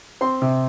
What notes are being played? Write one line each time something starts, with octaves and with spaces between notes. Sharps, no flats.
C4 C6
C3